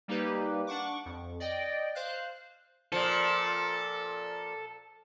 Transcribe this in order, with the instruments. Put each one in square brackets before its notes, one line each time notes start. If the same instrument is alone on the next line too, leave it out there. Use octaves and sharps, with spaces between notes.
[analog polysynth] G3 A#3 D#4 G4 B4
D4 F#5 C#6 D6
F2
D5 D#5 G5
C5 F5 F#6
[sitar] A#2 F3 [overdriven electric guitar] A4